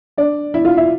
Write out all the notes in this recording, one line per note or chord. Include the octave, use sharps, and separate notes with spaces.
D4 D5
E4 E5
F4 F5
E4 E5